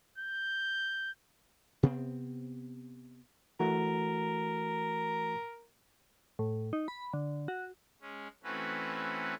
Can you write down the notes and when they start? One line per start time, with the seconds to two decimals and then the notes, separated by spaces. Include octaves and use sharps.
0.18 G6
1.83 C3 B3 C4
3.60 E3 A3 F#4 A#4
6.39 A2
6.73 D#4
6.88 B5
7.13 D3
7.48 F#4
8.01 G#3 C#4
8.43 E3 A3 C4 C#4 F#4 B4